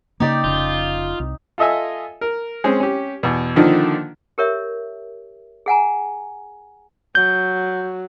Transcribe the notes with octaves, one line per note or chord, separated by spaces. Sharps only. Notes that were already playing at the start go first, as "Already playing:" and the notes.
C#3 A#3 D#4 G4 D5
F1 C#3 F4
C2
F4 A4 D#5 E5 G#5
A#4
G#3 C4 C#4
C#4 G4
E2 B2
D3 D#3 F3 A#3 D4 D#4
G4 A#4 C#5 E5
G#4 F#5 G#5 A#5
F#3 G6